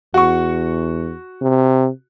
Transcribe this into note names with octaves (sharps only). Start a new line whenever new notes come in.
E2 F#4 C#6
C3